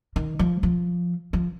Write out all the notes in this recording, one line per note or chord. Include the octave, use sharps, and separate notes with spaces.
D#3
F3
F3
F3